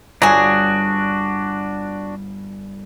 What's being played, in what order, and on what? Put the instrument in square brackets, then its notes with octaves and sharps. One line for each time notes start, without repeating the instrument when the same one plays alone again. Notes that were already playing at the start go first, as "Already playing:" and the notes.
[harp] G1 [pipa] F#3 G#4 [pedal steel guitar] D4 F#4